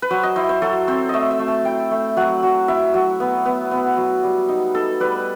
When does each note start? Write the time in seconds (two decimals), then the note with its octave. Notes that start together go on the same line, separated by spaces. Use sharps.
0.02 B4
0.11 F#3 C5
0.23 D#5
0.36 E4 C5
0.49 C5
0.62 F#3 A4
0.88 C4 C5
1.09 A3 D#5 E5
1.31 E5
1.39 A3
1.48 A5
1.65 E4 G5
1.91 A3
2.17 F#3 F#5
2.43 F#3
2.68 E4 E5
2.94 F#3
3.20 B3
3.45 B3
3.71 B3
3.97 F#3
4.23 G3
4.49 D#4
4.75 D#4 A4
5.00 G3 B4